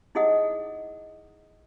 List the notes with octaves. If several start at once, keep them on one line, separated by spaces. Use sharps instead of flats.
D#4 E4 G#4 D#5 F#5 D#6